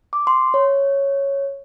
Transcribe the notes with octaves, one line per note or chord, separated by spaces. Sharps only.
D6
C6
C#5